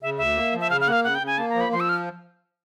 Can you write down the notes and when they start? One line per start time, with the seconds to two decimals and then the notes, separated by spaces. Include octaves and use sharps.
0.02 C#3 E5
0.18 D2 E5
0.36 A#3
0.54 F3
0.60 E5
0.70 C#3 F5
0.81 F5
0.87 A#3 F#5
0.93 F5
1.04 C#3 F#5
1.15 G5
1.22 C#3
1.27 G#5
1.38 A#3 A5
1.50 A#5
1.55 F3
1.61 B5
1.72 F3 C6
1.80 E6
1.89 F6